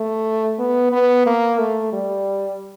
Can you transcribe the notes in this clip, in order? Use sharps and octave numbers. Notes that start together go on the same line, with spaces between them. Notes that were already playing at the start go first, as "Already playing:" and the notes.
Already playing: A3
B3
B3
A#3
A3
G3